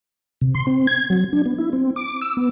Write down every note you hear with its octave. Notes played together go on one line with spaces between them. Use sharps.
C3
C6
C4
G#6
F#3
D4
B3
E4
C4
D6
E6
B3